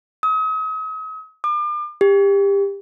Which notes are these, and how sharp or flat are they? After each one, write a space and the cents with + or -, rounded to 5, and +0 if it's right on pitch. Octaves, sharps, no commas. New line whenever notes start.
D#6 +40
D6 +40
G4 +25